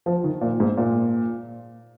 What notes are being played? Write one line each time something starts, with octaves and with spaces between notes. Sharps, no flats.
F3
D#3
A#2
G#2
A#2